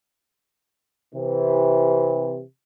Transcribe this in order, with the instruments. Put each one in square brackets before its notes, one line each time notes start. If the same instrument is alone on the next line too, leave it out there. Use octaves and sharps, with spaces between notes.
[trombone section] C3 E3